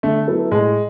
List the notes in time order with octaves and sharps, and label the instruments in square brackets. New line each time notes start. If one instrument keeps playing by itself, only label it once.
[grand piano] D3 [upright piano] A3
[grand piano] F#3 B3 E4 A4
[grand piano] A2 [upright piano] G#3